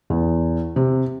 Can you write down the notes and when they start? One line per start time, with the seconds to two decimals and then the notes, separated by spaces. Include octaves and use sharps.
0.10 E2
0.76 C3